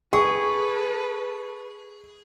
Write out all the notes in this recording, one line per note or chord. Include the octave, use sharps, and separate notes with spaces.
G#4 A4 B4 C#6